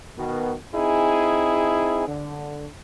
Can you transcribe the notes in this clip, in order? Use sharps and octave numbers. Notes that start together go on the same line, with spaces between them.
B2 D#3 B3 F#4 A#4
C4 D#4 E4 G#4
D3